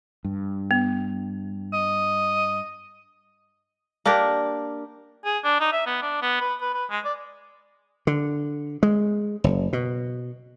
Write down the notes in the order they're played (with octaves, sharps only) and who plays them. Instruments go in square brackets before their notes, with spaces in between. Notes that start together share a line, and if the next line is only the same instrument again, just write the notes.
[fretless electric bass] G2
[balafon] B3
[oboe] D#5
[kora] A#3 D4 G4 A#4
[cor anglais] G#4
D4
D#4
E5
B3
D4
B3
B4
B4
B4
G#3
D5
[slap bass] D3
G#3
F#1
B2